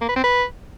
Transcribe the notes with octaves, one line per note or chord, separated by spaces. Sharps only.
A#3
B4
C4
B4